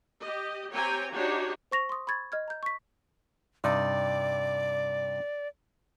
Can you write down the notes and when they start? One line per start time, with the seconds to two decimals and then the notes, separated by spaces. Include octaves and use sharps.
0.20 G4 D#5
0.72 C4 G4 C#5 G5 G#5 A#5
1.13 D4 D#4 F#4 G4 C#5
1.71 C5 C#6 A#6 F7
1.89 C6 D#6
2.07 B5 C#6 G#6 A6
2.32 D#5 F6 G#6
2.48 A#5 G6
2.63 C#6 B6
3.64 G2 C3 D#4 D5